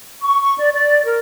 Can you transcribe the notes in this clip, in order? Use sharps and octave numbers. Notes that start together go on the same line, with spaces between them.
C#6
C#6
D5
D5
A#4